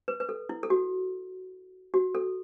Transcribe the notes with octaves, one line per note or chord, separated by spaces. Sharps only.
B4
B4
A4
E4
A4
F#4
F#4
A4